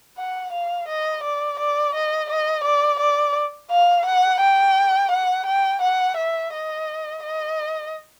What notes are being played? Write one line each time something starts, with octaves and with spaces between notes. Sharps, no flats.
F#5
F5
D#5
D5
D5
D#5
D#5
D5
D5
F5
F#5
G5
F#5
G5
F#5
E5
D#5
D#5